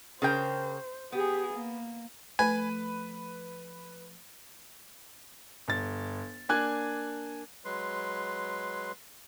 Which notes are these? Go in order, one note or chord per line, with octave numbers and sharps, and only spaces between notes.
C#3 A#4 C5 G5
B3 G4 G#4
A#3
F3 A3 B4 G#5
G1 A6
A#3 D4 G#5 F#6 G#6
F#3 G#3 B4 C6